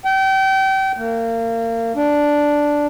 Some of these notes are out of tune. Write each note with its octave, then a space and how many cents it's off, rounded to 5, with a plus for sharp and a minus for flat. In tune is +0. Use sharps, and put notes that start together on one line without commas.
G5 -30
A#3 -30
D4 -5